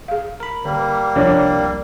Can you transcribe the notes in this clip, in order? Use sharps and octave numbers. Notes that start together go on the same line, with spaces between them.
G#4 F5
A#4 B5
D3 G3 A#3
C2 F3 D4 F4 C#5